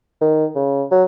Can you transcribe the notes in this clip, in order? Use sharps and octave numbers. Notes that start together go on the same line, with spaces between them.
D#3
C#3
F#3